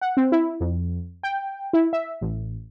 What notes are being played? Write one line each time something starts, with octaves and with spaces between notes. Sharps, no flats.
F#5
C4
E4
F2
G5
E4
E5
A1